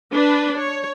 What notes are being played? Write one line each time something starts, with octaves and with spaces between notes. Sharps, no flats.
D4 B4
C#5